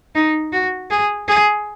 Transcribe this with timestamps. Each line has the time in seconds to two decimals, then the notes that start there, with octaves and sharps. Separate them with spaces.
0.15 D#4
0.52 F#4
0.90 G#4
1.28 G#4